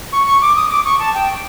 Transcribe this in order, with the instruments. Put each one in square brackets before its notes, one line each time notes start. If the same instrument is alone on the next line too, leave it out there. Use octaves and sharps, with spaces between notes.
[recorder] C#6
C#6
D6
D#6
D6
C#6
A5
G5